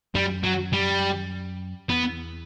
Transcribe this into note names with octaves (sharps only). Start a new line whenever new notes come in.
F#2 G3
F#3
G3
E2 B3